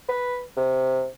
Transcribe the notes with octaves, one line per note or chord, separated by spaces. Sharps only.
B4
C3